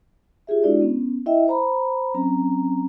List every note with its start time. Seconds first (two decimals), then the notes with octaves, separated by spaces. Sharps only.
0.47 F4 G4 G#4 E5
0.63 G#3 D4 E4 F#4 D5
0.81 B3 C#4
1.26 E4 D#5 E5 G5
1.48 C5 A#5 B5
2.14 F#3 C4 C#4 A#5